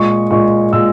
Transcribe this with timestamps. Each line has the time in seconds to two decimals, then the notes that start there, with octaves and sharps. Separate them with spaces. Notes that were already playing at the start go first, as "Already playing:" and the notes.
Already playing: A#2 G#3 C#6
0.31 A#2 G#3 C#6
0.73 A#2 G#3 E6